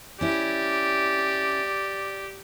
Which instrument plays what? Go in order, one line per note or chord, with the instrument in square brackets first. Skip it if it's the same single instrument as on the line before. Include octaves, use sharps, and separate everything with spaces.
[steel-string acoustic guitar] C#4 E4 [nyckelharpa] G4 [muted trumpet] D5